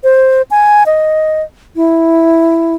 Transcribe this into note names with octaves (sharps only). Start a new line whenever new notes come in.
C5
G#5
D#5
E4